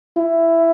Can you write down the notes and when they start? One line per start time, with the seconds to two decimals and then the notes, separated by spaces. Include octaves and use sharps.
0.17 E4